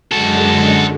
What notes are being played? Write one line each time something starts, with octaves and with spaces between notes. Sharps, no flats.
F#2 D3 G#3 F#4 A4